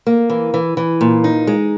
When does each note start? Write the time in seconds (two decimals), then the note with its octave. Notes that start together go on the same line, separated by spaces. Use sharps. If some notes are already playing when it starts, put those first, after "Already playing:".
0.07 A#3
0.30 E3
0.54 E3
0.77 E3
1.01 A#2
1.24 D#4
1.47 G#3